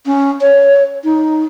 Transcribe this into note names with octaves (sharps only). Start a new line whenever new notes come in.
C#4
C#5
D#4